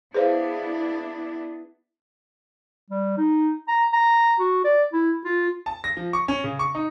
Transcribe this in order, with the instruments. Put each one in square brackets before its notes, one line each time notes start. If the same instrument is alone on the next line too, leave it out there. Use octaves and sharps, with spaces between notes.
[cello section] B3 D4 E4 [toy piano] G#4 D5 F5 [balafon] B4 C5
[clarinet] G3
D#4
A#5
A#5
F#4
D5
E4
F4
[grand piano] A5
A#6
F3
C#6
C#4
C#3
C#6
D#4